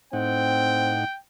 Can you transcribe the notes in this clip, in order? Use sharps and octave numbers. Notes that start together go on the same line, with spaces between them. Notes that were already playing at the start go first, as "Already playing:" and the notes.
A2 C4 D#4 F#5 G5